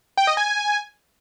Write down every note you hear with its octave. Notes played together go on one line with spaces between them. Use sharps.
G5
D#5
G#5